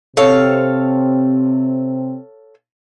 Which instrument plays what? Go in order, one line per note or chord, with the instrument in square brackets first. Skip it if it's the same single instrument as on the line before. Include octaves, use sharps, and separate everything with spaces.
[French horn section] C3 C4 [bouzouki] A4 C#5 F5